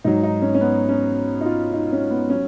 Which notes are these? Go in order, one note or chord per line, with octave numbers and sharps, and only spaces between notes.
G#2 F#3 D#4
D#4
C#4
C#4
B3
C#4
D#4
F4
D#4
C#4
B3
F#3 C#4